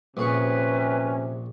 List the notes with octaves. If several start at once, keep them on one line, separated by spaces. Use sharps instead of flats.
A#1 C3 C#4 G#4 B4 C#6